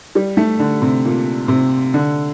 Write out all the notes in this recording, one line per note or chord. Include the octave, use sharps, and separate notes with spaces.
G3
A3
D3
C3
A#2
C3
D3